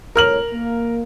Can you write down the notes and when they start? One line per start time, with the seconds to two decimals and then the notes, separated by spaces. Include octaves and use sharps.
0.16 C2 A2 A#4 C#5 F6 F#7
0.51 A#3